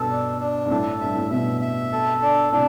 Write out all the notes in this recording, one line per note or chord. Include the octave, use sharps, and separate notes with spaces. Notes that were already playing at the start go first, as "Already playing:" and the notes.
Already playing: G2 B2 A4
D4
D4
G2
A2 A4
G2 E5
A2
G2 B2 E5
E5
A4
D4
A2 C3 D4